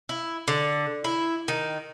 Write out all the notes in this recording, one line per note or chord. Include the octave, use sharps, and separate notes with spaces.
E4
D3
E4
D#3